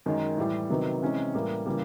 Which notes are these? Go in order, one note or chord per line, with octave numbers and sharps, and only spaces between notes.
F#2 D#3 G#3
A2 E3 G3
C3 D#3 F#3 B3
C3 E3 G#3 C#4
A2 E3 G3 A#3
C#3 E3 G3 A#3